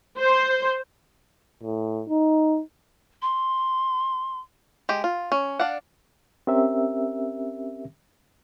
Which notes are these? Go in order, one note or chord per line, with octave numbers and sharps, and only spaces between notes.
C5
A2
D#4
C6
G#3 G4
F4
C#4
D4 D5 F5 F#5
C4 C#4 G4 A#4 E5